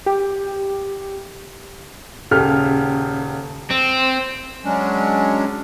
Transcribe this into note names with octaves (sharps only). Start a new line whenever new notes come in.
G4
D#1 C#3 G4 A4 F6
C4
F#3 G#3 C#4 D4